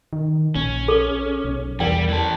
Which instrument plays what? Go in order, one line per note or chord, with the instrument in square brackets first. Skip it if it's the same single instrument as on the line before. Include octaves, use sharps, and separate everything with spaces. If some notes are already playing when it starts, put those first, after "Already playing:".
[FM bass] D#3
[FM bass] A#1 [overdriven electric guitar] C#4
[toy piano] G#4 A4
[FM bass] B1
[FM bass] E2 [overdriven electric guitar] G3 [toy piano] A#4 D5 G5
[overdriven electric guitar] E3 A4